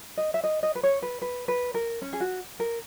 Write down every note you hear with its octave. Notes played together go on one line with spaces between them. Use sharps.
D#5
E5
D#5
D#5
B4
C#5
B4
B4
B4
A#4
C#4
G#4
F#4
A#4